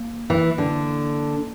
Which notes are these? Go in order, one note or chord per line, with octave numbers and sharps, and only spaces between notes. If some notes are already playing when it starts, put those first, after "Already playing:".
Already playing: A#3
E3
D3